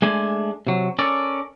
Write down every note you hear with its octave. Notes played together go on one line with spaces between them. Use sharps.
G#3 A3 D4 G#5
C3 F#3
C#4 A4 A#4 D5